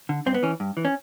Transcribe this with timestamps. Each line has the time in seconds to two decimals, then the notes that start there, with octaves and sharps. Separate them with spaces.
0.09 D3
0.26 G2 C4
0.34 B3
0.43 E3 C#4
0.60 G2
0.77 E3
0.85 C#4